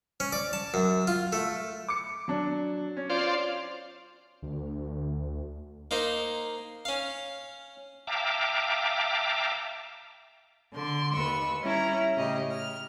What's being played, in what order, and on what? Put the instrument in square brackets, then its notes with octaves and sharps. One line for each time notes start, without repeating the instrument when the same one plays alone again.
[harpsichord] C#4
D5
A5
F#2
F4
A3
[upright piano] D6 C#7
F#3 D4
C#4
[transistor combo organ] F4 C5 D5
[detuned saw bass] D2
[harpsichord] A#3 D#4 C5
C#4 F5
[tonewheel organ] E5 F5 G5 A5 A#5 D6
[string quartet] D3 C6
D#2 B4 C#6 E6
G3 C#4 E4 A#5
A2 C#3 G4 D#5
F6